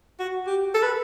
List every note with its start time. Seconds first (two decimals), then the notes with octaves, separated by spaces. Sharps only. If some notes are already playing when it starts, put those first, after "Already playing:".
0.20 F#4
0.47 G4
0.74 A4
0.83 B4